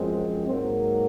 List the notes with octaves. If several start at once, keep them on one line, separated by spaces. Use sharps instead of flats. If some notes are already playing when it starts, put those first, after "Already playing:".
Already playing: F#2 F3 G#3 C4
G#2 F#3 A#3 C4